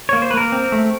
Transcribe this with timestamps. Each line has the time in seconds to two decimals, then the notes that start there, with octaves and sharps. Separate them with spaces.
0.09 A#3 C#5
0.22 C5
0.31 B4
0.34 A#3 A#4
0.52 C4
0.72 A3